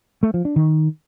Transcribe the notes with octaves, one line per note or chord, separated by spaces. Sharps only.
A3
F3
D4
D#3